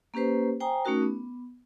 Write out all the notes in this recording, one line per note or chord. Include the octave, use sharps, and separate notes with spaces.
A#3 C#4 G4 B4 C5
C5 G5 G#5 A#5 D#6
A3 C#4 D#4 F#4 A#4
B3